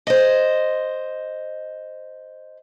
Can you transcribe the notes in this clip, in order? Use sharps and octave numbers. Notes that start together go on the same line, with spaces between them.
C5 D#5